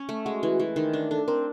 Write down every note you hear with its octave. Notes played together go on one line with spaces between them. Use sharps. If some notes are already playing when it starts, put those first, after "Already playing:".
Already playing: C#4
A3
G#3 F#4
E3
E3
D#3
D4
D4 A4
C4 A#4